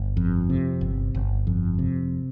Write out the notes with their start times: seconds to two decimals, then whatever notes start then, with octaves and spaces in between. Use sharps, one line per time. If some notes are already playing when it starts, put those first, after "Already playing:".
Already playing: G1
0.17 F2
0.50 C3
0.81 G1
1.15 G1
1.47 F2
1.79 C3